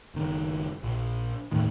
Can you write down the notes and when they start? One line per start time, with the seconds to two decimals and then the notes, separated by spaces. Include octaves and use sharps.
0.15 F#1 D#3
0.83 A#1
1.52 D#2 A2 D#3